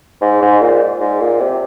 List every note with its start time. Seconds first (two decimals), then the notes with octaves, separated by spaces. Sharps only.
0.21 G#2
0.42 G#2
0.61 A#2
1.00 G#2
1.20 A#2
1.40 C3